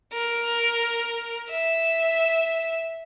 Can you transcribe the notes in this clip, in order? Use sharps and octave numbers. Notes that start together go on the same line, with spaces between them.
A#4
E5